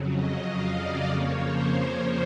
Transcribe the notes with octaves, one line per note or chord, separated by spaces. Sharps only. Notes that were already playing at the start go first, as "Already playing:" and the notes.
Already playing: F2 C#3 F#3
D#5
F5
D5
F2 C#3 F3 A#3 C#5
C5